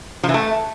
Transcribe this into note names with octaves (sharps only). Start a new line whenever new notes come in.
F3
E3
A3